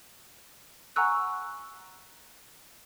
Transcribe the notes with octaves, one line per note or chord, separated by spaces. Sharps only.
F#5 G#5 A#5 C#6 E6 F#6